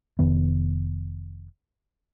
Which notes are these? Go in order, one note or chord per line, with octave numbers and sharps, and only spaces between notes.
F1 F2 D#3 B3